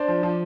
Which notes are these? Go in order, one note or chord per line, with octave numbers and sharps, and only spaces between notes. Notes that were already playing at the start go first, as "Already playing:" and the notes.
Already playing: D4 C5 D5
F3
F3